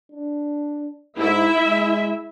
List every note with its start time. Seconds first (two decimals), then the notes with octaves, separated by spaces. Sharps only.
0.12 D4
1.18 G#2 E4 E5
1.64 G#3